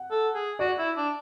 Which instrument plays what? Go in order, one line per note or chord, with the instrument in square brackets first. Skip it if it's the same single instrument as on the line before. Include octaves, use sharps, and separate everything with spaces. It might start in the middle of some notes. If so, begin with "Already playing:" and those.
Already playing: [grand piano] F#5
[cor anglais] A4
G#4
[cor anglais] F#4 [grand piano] D5
[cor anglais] E4
D4